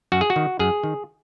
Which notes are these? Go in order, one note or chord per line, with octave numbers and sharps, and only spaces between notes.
F#2 F#4
G#4
F#4
D#3
F#2 G#4
D#3